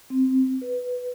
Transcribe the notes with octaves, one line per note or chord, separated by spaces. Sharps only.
C4
B4